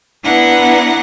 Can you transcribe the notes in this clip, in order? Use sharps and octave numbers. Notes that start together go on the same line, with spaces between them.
B3 D4 E4 B4 F#5 A#5